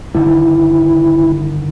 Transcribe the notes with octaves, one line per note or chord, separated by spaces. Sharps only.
G2 D3 D#3 E4